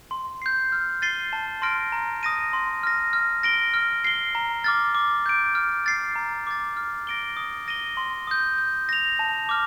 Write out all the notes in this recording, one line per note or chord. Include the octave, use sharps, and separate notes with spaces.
C6
G6 C7
F6
A6 C7 D#7 G7
A5
C6 F6 A#6 D7
A#5
D#6 A#6 D#7
C6
F6 A#6
F6
A#6 D7 G7
F6
C7 G7
A#5
D6 F6 A6
D6
G6 D7
F6
A6 C7
A#5
D6 A6
F6
A#6 D7 G7
D#6
A#6 D#7 G7
C6
D#6 G6
G6
A#6 F7
A5
D6 F6